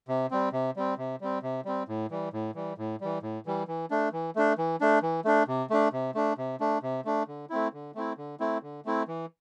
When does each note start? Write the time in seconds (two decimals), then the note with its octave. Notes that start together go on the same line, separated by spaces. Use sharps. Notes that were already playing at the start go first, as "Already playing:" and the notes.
0.08 C3
0.31 G3 C4
0.53 C3
0.76 G3 C4
0.98 C3
1.21 G3 C4
1.43 C3
1.65 G3 C4
1.88 A2
2.11 E3 G3
2.33 A2
2.55 E3 G3
2.78 A2
3.01 E3 G3
3.22 A2
3.46 E3 G3
3.68 E3
3.91 A3 D4
4.12 E3
4.36 A3 D4
4.58 E3
4.81 A3 D4
5.03 E3
5.25 A3 D4
5.48 C3
5.70 A3 D4
5.93 C3
6.15 A3 D4
6.38 C3
6.60 A3 D4
6.83 C3
7.05 A3 D4
7.28 D3
7.50 A3 C4 E4
7.73 D3
7.95 A3 C4 E4
8.17 D3
8.40 A3 C4 E4
8.63 D3
8.85 A3 C4 E4
9.08 E3